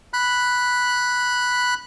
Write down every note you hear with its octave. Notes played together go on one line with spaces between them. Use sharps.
B5 F#6